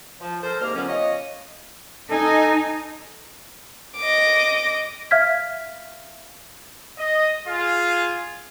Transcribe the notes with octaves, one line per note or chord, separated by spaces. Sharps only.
F3
A4 A#4 C5
C2 G#2 A#3 A#4 D6 F6
F2 A#2 D3 F#3 B3 C#4
C#4 F4 C#5 D#5
D#4 A4 G#5
D#5 D6
E5 F5 F6 G#6 B6
D#5
F4 G#4